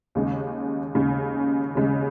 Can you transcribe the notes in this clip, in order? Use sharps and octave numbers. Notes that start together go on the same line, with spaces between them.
D#2 C#3 G#3
D#2 C#3 G#3
D#2 C#3 G#3